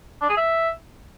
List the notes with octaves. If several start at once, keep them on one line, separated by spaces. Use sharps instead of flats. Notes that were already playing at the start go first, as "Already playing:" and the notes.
D4
G#4
E5